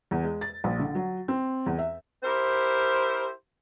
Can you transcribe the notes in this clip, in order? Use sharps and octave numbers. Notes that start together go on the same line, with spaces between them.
E2
G#3
A6
A#1
D3
F#3
C4
E2
E5
E4 G4 A#4 C5